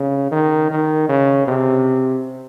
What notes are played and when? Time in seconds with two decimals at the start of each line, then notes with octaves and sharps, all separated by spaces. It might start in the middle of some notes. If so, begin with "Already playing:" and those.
Already playing: C#3
0.31 D#3
0.70 D#3
1.09 C#3
1.47 C3